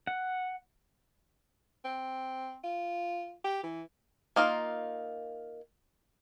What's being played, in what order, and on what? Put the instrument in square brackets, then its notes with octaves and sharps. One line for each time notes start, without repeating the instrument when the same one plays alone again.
[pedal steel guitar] F#5
[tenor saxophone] C4
F4
G4
E3
[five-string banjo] A#3 D#4 F4 A#4